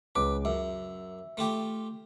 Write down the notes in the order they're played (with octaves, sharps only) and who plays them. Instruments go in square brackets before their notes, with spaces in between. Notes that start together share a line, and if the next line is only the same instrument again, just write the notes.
[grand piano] C#2 D6 [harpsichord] B4
[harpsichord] F#2 [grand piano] E5
[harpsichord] A3 F4 G4